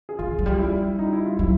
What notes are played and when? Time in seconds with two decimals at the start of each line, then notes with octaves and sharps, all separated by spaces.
0.09 G#4
0.19 E3 F4
0.39 F#3
0.46 G3
0.59 E4
0.99 D#4
1.13 E4
1.26 F4
1.37 F#3 E4